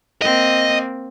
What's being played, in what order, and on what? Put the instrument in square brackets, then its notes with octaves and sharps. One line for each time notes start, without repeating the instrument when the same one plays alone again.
[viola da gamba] A#3 C4 [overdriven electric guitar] D#5